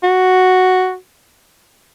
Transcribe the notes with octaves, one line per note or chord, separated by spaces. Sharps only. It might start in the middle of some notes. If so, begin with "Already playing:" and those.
F#4